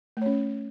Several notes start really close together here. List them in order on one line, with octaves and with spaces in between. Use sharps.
A3 C#5 C#4